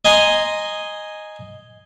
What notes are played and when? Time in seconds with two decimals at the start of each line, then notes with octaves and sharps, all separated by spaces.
0.05 D#5 G#5 A#5 C6